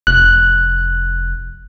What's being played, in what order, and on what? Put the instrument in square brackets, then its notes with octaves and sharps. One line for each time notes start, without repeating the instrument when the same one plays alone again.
[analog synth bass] F1 [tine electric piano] F#6